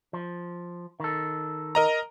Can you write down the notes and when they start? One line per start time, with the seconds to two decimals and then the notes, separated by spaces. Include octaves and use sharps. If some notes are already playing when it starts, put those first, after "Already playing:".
0.13 F3
1.00 D#3 A4
1.75 A#4 D#5 A#5